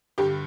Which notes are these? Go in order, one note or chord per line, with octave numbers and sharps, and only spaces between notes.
G2 D3 G3 G4